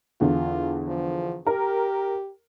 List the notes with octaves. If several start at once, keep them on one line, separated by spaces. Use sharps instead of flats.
E2 D3 F4
F3
G4 A#4